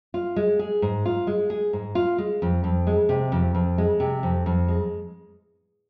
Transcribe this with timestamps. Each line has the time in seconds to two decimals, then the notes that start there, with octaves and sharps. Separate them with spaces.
0.14 F4
0.36 G#3
0.59 G#4
0.82 G#2
1.05 F4
1.27 G#3
1.50 G#4
1.73 G#2
1.95 F4
2.18 G#3
2.42 F2
2.64 F2
2.87 G#3
3.09 C3
3.32 F2
3.55 F2
3.78 G#3
4.00 C3
4.23 F2
4.46 F2
4.68 G#3